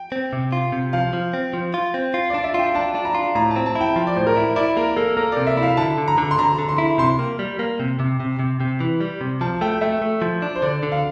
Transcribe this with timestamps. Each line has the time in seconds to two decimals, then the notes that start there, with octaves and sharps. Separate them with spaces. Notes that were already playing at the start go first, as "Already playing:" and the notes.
Already playing: G5
0.12 C4
0.33 C3
0.52 F4
0.72 C3
0.93 F3 F5
1.13 F3
1.33 C4
1.54 F3
1.74 F4
1.94 C4
2.14 F4
2.30 D4 D5
2.44 E5
2.54 F4 G5
2.75 D4 A5
2.95 D4
3.05 A#5
3.15 F4
3.35 A2 A#5
3.51 A5
3.56 C4
3.66 A5
3.75 E4
3.81 G5
3.96 F3
4.07 D5
4.16 A2 C5
4.27 A#4
4.36 E4
4.56 E4 D5
4.77 A#3 A#4
4.96 A#3 A4
5.17 A#3 A#4
5.32 C3 D5
5.47 E5
5.57 E4
5.62 F5
5.77 D3 A5
5.98 D3
6.08 A#5
6.18 D3
6.31 C6
6.38 D3 A#5
6.59 D3
6.69 C6
6.78 E4
6.98 C3 C6
7.19 A#3
7.39 G3
7.59 A#3
7.80 C3
8.00 C3
8.20 C3
8.39 C3
8.60 C3
8.80 E3
9.01 G3
9.21 C3
9.41 F3 A5
9.61 A3 G5
9.81 A3 E5
10.02 A3
10.22 F3
10.42 D4
10.56 C5
10.62 D3 D5
10.83 D3
10.92 F5